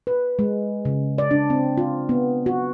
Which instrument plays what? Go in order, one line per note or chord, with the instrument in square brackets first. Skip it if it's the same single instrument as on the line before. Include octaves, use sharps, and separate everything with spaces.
[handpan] B4
G#3
C#3
D5
D4
C4
F4
B3
F#4